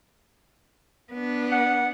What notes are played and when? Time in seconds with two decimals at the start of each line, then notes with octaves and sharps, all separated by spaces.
1.12 B3 D4
1.52 F#5